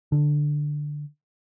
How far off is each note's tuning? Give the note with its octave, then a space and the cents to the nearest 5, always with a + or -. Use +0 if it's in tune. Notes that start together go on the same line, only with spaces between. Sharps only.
D3 +5